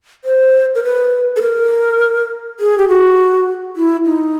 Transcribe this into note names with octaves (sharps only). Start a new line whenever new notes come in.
C5
A#4
B4
A4
A#4
G#4
G4
F#4
E4
D#4